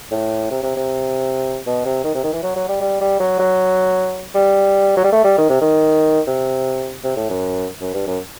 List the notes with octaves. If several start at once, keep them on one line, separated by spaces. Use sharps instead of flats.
A2
C3
C3
C3
B2
C3
D#3
C3
D#3
E3
F#3
F#3
G3
G3
G3
F#3
F#3
G3
F#3
G3
A3
G3
D#3
C3
D#3
C3
C3
A2
F#2
F#2
G2
F#2